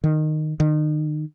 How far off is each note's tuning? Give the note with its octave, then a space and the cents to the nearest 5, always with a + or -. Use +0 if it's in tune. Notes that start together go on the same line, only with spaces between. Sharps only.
D#3 -15
D#3 -35